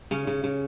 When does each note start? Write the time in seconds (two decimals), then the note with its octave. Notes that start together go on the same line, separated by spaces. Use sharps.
0.11 C#3 C#4
0.27 C#3
0.44 C#3